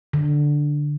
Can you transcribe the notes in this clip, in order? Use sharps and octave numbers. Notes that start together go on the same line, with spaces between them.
D3